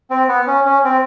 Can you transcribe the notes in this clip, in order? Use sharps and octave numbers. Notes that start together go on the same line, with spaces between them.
C4
B3
C#4
C#4
C4